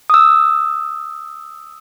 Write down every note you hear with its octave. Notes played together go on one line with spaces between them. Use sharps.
D#6 E6